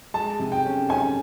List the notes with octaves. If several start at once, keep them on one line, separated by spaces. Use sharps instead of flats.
G#3 A5
C3
G5
C#4
C#4 G#5